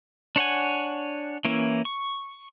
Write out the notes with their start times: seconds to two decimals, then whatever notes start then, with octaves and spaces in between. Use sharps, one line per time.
0.36 D4 C#5 F#5 G#5
1.45 E3 A#3 C#4 E4
1.85 C#6